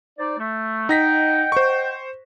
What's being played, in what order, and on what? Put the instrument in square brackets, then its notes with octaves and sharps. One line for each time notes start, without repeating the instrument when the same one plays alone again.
[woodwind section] D#4 C5 D5
A3
[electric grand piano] D#4 A#6 B6 [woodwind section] D#5 F#5 G5
[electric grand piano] C5 C#6